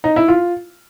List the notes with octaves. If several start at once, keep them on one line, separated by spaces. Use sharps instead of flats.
D#4
E4
F4